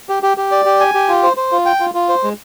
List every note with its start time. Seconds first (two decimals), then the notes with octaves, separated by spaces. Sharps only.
0.09 G4
0.23 G4
0.37 G4
0.52 D5
0.65 G4
0.80 G#5
0.94 G4
1.09 F4
1.23 C5
1.37 C5
1.52 F4
1.66 G5
1.80 F4
1.94 F4
2.09 C5
2.24 G#3